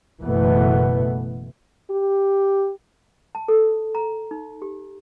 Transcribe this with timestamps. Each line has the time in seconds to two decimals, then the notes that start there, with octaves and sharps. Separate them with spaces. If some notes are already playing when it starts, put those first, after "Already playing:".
0.22 F#1 B2 E3 A3 B3
1.91 G4
3.35 A5
3.48 A4
3.95 A#5
4.31 D#4
4.62 G4